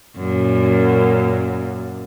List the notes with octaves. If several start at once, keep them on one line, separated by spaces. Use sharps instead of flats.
F#2 A#2